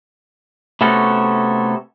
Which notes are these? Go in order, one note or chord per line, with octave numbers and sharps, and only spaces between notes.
C3 A3 B3 C#4 F#4 A4